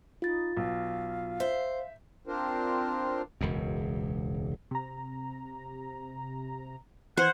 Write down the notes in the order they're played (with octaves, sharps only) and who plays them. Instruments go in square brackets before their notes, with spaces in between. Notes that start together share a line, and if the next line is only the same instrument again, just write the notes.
[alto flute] D#4 [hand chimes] F4 A6
[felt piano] B1 [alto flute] F5
[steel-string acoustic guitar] C5 [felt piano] E5
[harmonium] C4 D4 F4 A#4 C5
[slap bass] E1 C#2 F#2
[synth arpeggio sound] C3 A#5
[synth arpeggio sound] E3 G#6 [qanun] C5 [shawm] F#5